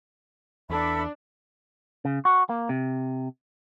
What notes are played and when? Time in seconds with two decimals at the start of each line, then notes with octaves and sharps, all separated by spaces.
0.70 E2 D4 A4 E5 B5
2.05 C#3
2.25 F#4
2.49 A#3
2.69 C3